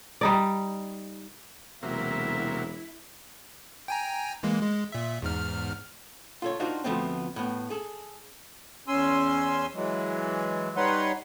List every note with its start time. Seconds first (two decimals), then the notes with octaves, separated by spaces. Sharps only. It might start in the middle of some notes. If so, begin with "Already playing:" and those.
0.21 G3 D#4 D5
1.83 E1 C3 F#3 A#3 E4 E5
3.88 G5 G#5 A#5
4.43 E3 G#3 A#3
4.62 G#3
4.92 A#2 E5
5.22 E2 G#2 F6
6.42 F4 A4 C#5
6.60 D4 D#4 F4 F#4 A#4 C5
6.84 D2 F3 A3 B3 C4
7.36 A2 B3
7.70 G#4 A4
8.88 E2 C#4 G#5 C6 E6
9.74 E3 F#3 G#3
10.77 G3 D#4 B4 C#5 F#5 C6